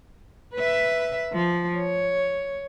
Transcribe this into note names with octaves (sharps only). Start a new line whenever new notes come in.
B4 E5
F3
C#5